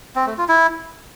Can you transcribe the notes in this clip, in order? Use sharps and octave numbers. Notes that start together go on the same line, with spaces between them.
C4
A3
F4
E4